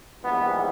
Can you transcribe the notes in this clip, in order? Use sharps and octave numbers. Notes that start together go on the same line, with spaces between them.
A#1 G#2 E3 G3 B3